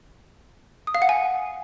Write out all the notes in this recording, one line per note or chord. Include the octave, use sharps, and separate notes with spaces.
D#6
F5
F#5
G#5